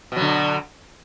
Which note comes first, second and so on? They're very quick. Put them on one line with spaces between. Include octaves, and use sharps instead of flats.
B2 F#3 D3